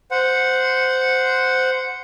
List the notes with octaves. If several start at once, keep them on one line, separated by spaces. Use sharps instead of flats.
C5 F#5